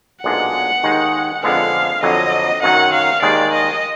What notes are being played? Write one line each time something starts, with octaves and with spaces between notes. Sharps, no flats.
B1 A#2 G#3 D4 F#5
D#2 D#3 G#3 D#4
F2 D3 G#3 B3 F5
F2 D3 F#3 D#5
F#2 D#3 F#3 F#5
F5
D#2 D#3 G#3 D5
D#5